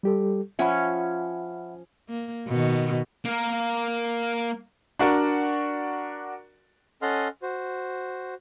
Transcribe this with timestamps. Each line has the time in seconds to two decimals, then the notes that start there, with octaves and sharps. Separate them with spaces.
0.03 G3 G4 A4
0.59 F3 C#4 E5 F#5 B5
2.09 A#3
2.47 B2 D#3
3.25 A#3 A#4
4.99 D4 F#4 A#4 D5
7.02 C#4 A4 D#5 F#5 C6 F6
7.42 F#4 C5